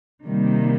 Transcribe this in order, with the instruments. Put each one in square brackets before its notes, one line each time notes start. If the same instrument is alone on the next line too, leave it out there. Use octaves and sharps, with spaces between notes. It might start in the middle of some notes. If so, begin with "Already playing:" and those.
[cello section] C3 D#3 G3 A#3